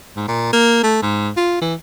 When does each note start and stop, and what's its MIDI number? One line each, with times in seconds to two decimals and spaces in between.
0.16 0.23 44
0.28 0.48 46
0.53 0.81 58
0.83 0.99 57
1.02 1.30 44
1.36 1.60 65
1.61 1.74 52